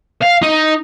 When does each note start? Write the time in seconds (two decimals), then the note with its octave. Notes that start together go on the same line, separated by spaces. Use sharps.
0.22 F5
0.42 D#4